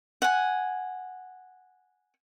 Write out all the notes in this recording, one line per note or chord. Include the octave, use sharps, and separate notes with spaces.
F#5 G#5